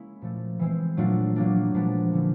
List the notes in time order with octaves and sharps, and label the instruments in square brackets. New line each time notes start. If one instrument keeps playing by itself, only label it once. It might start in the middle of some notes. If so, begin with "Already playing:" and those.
Already playing: [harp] G#3 A#3 C#4 E4
A#2 F3 A3
E3 G#3 C4
A#2 F#3 A3 D4 F4
F#3 A#3 D4
A#2 F3 G#3 B3 D4
D3 G3 A#3 C#4 E4